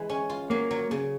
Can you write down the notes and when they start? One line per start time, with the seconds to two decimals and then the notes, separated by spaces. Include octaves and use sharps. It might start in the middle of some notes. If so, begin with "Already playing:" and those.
Already playing: E3 G#3
0.10 C#4
0.30 F4
0.50 F#3 A#3
0.71 F#3
0.91 C#3